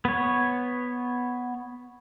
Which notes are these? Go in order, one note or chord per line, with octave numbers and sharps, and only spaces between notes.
B3 C#5